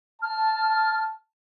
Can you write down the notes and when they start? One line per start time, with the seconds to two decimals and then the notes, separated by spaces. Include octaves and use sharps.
0.22 A5 F6